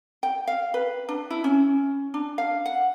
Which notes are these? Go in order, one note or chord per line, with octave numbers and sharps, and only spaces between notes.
G5
F5
B4
D4
E4
C#4
D4
F5
F#5